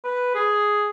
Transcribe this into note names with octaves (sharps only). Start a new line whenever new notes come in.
B4
G#4